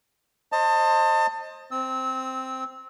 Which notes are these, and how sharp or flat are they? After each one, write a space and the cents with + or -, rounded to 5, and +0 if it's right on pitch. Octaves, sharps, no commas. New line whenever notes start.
C5 +25 D#5 +0 A5 +30
C4 +0 E6 -25